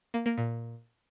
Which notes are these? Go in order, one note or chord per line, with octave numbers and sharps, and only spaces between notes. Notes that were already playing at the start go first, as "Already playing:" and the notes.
A#3
A#3
A#2